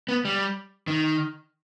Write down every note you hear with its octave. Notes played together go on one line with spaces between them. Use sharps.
B3
G3
D#3